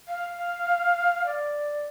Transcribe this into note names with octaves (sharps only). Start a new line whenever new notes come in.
F5
D5